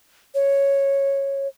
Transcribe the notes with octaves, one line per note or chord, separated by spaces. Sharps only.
C#5